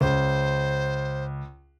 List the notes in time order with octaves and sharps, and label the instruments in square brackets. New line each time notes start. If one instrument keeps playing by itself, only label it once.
[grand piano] C#2 [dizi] C5